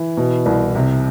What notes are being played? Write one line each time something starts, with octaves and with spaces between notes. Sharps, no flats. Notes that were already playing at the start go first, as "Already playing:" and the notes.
Already playing: E3
B2
C2
C3